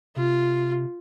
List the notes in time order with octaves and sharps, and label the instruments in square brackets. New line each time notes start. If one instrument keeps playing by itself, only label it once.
[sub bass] C3 [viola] F4